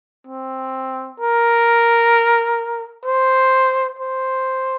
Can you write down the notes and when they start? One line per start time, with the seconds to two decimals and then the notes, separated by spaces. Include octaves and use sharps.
0.28 C4
1.20 A#4
3.06 C5
3.99 C5